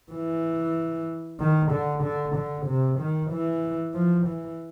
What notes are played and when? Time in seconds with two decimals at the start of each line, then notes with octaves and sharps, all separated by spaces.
0.12 E3
1.40 D#3
1.71 D3
2.03 D3
2.35 D3
2.66 C3
2.99 D#3
3.31 E3
3.94 F3
4.27 E3